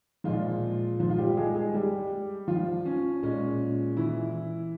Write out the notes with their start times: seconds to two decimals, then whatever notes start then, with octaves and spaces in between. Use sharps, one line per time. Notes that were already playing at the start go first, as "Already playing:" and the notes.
0.24 A#2 F3 G#3 F4
1.00 F3 F4
1.10 F4
1.18 G3 G4
1.37 G#3 G#4
1.55 G#3 G#4
1.74 G3 G4
2.48 F3 F4
2.86 C#4
3.23 A#2 G#3 C#4
3.97 E3 E4